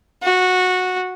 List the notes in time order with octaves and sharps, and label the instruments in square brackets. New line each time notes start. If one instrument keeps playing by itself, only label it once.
[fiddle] F#4